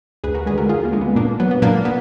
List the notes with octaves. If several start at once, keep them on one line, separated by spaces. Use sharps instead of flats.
D2 G#4 B4
F#4 A#4
D3 G#3 G#4 B4
F#4 A#4
D2 F4 G#4
A#3
D3 G#3
B3
A#2 A#3 D4
F#3 B3
B3
A#2 A#3 D4
B3